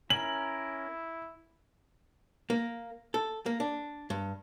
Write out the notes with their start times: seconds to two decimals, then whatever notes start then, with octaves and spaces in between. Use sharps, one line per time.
0.10 C#4 E4 A#4 F#7
2.50 A#3
3.14 A4
3.46 A#3
3.60 D4
4.10 G2